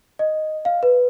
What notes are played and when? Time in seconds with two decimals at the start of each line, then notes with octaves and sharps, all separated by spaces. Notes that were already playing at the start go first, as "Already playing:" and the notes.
0.19 D#5
0.65 F5
0.83 B4